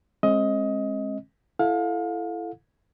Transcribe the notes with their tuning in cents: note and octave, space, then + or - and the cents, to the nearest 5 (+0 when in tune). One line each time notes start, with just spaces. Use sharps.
G#3 +0 C4 +40 D#5 +20
E4 +25 A4 -10 F5 +35